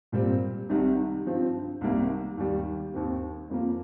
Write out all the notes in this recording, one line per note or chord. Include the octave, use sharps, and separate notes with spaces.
A#2 G3 C4
C2 C3 D#3 G3 D#4
G2 F3 C4
C2 C3 D#3 G3 A#3
D#2 D#3 G3
D#2 D#3 C4
F2 F3 A#3